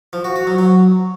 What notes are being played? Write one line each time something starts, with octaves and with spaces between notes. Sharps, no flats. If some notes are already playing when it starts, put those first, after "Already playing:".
F3
F#4
F#4
F#3
F#3